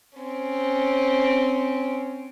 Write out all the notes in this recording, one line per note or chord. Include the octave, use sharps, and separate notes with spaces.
C4 C#4